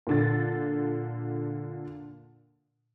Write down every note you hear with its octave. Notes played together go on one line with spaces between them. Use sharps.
A#2 D3 A6